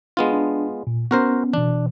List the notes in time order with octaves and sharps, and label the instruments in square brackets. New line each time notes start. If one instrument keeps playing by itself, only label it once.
[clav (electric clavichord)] G#3 B3 F4 [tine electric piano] D4
[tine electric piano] D4
A#2
[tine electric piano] B3 C#4 [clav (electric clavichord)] F#4 A#4 C5
[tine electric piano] B2 E3 [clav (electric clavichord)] D4